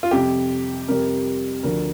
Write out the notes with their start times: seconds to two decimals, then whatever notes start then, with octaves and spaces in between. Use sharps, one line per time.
0.03 F4
0.11 F2 C3 G3 G4
0.88 F2 C3 G3 A#4
1.63 D2 D3 F3 A#4